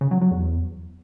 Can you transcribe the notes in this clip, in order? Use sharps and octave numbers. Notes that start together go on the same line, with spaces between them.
C#3
F#3
F#3
E2